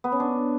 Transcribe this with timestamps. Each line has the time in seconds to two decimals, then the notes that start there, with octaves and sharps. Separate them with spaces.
0.04 B3
0.12 C#4
0.20 D4